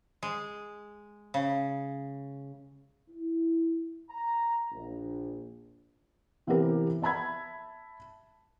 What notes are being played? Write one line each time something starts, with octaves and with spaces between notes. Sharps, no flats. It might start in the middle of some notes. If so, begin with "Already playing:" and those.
G#3
C#3
E4
A#5
A#1
C3 E3 B3 C4 G4 A#4
E5 A5 B5 G#6